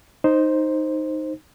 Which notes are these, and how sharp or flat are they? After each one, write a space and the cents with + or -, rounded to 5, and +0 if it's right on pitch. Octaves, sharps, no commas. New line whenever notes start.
D#4 +0 C5 +5